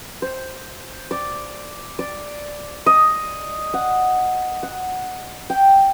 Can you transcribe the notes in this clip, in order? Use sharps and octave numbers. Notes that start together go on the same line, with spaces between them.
C5
D5
D5
D#5
F#5
F#5
G5